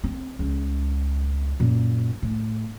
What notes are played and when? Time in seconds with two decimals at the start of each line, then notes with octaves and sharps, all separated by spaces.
0.04 C4
0.39 C#2
1.60 F#2 A#2
2.22 A2